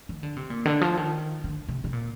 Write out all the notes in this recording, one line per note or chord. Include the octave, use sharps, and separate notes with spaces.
D#3
D3
C3
A#2
D3
F3
D#3
D3
C3
C3
A#2